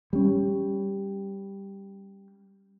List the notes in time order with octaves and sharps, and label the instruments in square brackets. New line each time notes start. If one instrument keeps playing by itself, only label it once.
[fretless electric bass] G3 C#4